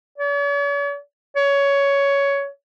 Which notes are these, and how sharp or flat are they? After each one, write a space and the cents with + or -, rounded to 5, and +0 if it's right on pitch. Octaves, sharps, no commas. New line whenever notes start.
C#5 +45
C#5 +15